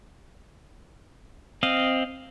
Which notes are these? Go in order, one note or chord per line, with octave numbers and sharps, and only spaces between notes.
C4 D#5 F5